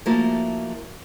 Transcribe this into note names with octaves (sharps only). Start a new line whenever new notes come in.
F3 A3 A#3 E4 F#4